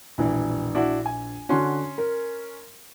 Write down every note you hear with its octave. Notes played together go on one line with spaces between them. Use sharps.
E1 A#1 E3
D4 E4 F#4
G#5
D3 C#4 D4 F#4 C6
A#4